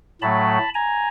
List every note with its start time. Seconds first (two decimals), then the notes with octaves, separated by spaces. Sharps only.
0.21 A2 F#3 A3 A5 B5
0.75 G#5 A#5